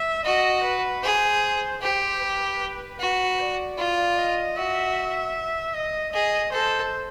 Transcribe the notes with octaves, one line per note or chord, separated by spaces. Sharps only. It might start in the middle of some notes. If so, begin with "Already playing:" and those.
Already playing: E5
F#4 D#5
B4
G#4 C5
G4 C5
B4
F#4 B4
D5
F4
D#5
F#4 E5
D#5
G#4 D#5
A4 C5